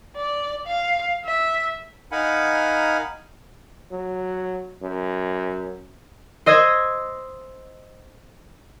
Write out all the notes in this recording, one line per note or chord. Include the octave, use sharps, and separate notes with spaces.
D5
F5
E5
D#4 A#4 F5 F#5 G#5 B5
F#3
F#2
C5 D#5 E6 G#6